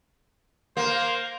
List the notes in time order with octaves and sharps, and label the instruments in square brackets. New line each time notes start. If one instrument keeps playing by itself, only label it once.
[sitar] A#3 [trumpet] C5